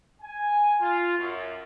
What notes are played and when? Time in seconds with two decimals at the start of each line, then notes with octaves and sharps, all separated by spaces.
0.22 G#5
0.80 F4
1.18 F#2